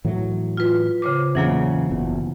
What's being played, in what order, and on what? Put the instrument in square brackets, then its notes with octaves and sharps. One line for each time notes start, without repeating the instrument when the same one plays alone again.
[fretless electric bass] A2 E3 F#3
[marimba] F4 B4
C#3 C5 D6
[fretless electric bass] E2 A#2 C#3 [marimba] E3 F#3 A#3
[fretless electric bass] F#1 E2 B2